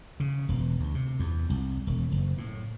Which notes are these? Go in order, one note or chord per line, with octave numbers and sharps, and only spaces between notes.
C#3
E1
D2
C3
E2
C2
E1
F#1
A2